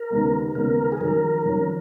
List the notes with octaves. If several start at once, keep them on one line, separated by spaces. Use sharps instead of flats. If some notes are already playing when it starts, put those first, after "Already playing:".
Already playing: A#4
D#2 C#3 G#3 B3
D#2 C#3 G#3 B3 A#4
G#4
F2 D#3 F#3 C#4 A#4
F2 D#3 F#3 C#4